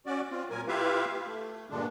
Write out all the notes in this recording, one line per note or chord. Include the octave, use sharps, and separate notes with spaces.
C#4 F#4 D5
C4 F4
A#2 F#3 A#4 G#5
E4 F4 G4 B4 E5 F5
A3
G2 A#2 D3 G#3 D4